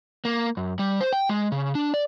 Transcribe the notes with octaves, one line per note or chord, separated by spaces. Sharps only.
A#3
F#2
G3
C5
G5
G#3
C#3
D4
D5